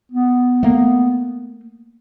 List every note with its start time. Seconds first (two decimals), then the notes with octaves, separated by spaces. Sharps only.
0.12 B3
0.63 A3 A#3